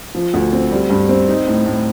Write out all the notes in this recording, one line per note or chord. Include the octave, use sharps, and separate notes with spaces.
F3
D2
C4
G3
G2
C4
D#4
A2
A2